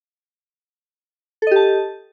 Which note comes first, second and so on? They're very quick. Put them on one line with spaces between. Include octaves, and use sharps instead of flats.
A4 D#5 G4 A5